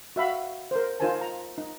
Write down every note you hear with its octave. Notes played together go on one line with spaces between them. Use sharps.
F#4 E5 F5 B5
A#4 C5
D#4 F4 A#4 C5 G#5 A5
A#5
D#4